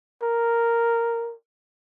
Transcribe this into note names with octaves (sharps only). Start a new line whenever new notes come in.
A#4